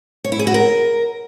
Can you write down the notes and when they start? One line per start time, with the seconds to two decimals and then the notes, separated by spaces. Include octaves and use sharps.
0.24 C#5
0.32 E4
0.39 G#4
0.47 F#4
0.54 A#4